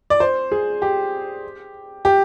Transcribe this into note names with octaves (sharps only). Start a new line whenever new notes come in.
D5
C5
G#4
G4
G4